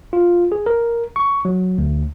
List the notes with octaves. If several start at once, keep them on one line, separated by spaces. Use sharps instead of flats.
F4
G#4
A#4
C#6
F#3
D2